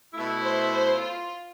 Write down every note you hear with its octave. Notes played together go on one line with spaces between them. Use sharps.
B2 A3 E4
C5
C5
F4